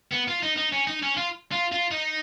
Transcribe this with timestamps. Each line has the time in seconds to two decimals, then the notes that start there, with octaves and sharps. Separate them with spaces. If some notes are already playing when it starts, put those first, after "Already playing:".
0.13 B3
0.29 F4
0.43 D#4
0.57 D#4
0.73 C#4
0.87 D#4
1.03 C#4
1.17 F4
1.52 F4
1.72 F4
1.91 D#4